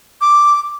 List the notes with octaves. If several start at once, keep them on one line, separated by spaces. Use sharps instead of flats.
D6